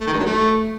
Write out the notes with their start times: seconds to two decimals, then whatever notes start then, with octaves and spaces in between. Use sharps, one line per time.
0.01 A3
0.07 D#3
0.13 G2
0.19 F#3
0.26 A3